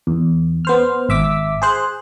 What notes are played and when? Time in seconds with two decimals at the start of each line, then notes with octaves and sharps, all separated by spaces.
0.07 E2
0.65 B3 C5 F6
1.09 G#1 E5 D6 B6
1.62 G#4 C5 F#6